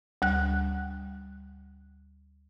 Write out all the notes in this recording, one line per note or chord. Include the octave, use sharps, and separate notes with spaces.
D2 G3 F#6